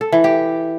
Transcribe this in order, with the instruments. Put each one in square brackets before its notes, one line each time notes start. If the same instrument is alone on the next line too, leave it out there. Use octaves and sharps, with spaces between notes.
[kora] A4
E3
G4